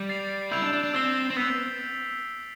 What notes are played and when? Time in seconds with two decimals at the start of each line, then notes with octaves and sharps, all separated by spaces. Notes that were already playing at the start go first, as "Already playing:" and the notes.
Already playing: G3
0.09 A6 C7 F7
0.51 E4 E6 G6 D7 F7
0.62 D4
0.73 D4
0.84 D4
0.94 C4 E6 A6 C7 G7
1.30 C4
1.36 B3 E6 B6 F7